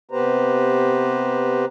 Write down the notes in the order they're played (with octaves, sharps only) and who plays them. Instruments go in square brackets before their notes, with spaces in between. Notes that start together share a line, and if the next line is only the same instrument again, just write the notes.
[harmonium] C3 B3 G4 B4 C5 A#5